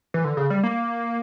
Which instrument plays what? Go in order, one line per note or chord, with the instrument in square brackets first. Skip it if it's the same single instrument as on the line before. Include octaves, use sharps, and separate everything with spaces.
[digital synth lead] E3
D3
C#3
G3
A#3